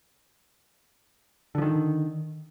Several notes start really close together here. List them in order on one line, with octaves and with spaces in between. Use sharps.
D3 F3 D#3